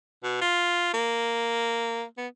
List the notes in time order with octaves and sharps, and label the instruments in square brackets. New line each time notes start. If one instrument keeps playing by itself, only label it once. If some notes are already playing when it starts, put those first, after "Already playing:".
[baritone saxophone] B2
F4
A#3
B3